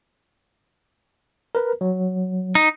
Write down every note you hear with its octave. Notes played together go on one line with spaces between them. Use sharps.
A#4 B4
F#3
D#4